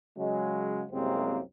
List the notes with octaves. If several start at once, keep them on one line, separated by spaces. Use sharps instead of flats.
C#3 F#3 G#3
C2 F#2 C3 G#3 A#3 C4